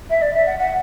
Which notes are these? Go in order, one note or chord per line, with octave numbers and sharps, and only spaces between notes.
E5
D5
E5
F#5
F#5